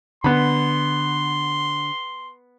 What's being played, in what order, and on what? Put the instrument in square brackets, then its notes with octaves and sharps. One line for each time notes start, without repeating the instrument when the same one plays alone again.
[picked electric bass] D3 [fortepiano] B3 B5 [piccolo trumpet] C6